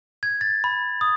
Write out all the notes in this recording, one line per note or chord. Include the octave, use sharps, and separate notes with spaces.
G#6
A6
B5
D#6